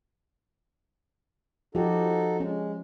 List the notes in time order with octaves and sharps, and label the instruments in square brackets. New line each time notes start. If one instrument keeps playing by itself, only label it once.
[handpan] F3 G4 [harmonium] D#4 F#4 A4
[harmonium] G#3 [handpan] C#4